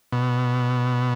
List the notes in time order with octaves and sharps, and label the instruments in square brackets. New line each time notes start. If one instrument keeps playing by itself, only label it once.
[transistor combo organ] B2